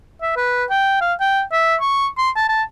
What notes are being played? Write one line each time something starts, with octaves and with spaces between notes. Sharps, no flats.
E5
B4
G5
F5
G5
E5
C#6
C6
A5
A5